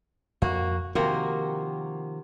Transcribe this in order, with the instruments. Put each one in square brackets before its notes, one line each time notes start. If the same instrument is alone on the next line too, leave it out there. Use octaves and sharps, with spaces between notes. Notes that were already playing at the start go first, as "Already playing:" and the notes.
[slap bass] F2 [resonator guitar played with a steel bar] A#3 F#4
[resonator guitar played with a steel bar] C3 A#3 F#4 [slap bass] D#3 F3 [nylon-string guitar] G4 A#4